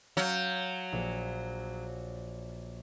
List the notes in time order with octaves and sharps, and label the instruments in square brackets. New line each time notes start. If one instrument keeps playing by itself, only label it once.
[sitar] F#3 [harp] F5 G6
[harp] A#1